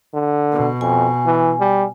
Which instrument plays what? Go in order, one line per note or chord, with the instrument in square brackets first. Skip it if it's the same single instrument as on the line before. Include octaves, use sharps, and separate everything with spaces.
[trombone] D3
[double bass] B2
[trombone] F2 [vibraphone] G#5
[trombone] E3
G3